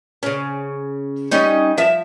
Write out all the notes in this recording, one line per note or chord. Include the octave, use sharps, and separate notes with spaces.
C#3 C#4
G3 C#4 D#4
F3 E5